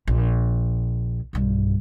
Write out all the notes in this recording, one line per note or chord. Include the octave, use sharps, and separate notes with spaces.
A#1
B1 G2